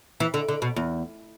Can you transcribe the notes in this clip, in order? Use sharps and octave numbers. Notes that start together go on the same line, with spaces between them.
E3
D3
D3
B2
E2